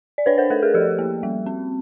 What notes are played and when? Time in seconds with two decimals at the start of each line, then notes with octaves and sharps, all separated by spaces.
0.18 D5
0.26 D4 B4 C#5
0.38 A#4 C5
0.50 A3 A4 B4
0.62 G#4 A#4
0.74 F3 G4 A4
0.99 A#3
1.23 G3
1.46 C4